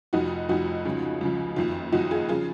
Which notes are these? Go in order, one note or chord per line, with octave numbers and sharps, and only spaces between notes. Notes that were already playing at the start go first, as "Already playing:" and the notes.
F1 F2 F3 D#4 F#4
F1 F2 F3 D#4 F#4
C#2 C#3 F3
C#2 C#3 F3
F#1 F2 D#3 F4
F#1 F2 D#3 D#4 F#4
F4 G#4
C#3 F3 F4 G#4